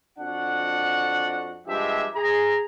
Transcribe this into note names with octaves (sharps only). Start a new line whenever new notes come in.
F2 D4 F#4 F#5
G2 F3 G#3 D4 G4 E5
G#4 A#5